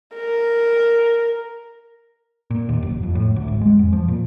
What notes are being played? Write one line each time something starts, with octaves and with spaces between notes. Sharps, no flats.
A#4
A#2
D#2
F#1
F2
A2
D2
G#1
G#3
F2
F3
A#2